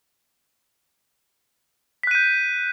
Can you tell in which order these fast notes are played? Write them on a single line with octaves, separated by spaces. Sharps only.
B6 F#6 D#7 G6